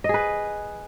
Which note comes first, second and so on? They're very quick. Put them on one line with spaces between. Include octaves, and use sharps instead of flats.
D#5 G#4 B4